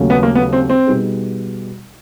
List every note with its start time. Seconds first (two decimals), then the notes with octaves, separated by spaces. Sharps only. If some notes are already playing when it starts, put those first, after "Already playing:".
Already playing: D#2 C#3 F#3 A3 C#4
0.10 B3
0.23 A#3
0.35 B3
0.53 C4
0.70 C4
0.86 B2 G3 B3 D#4 G#4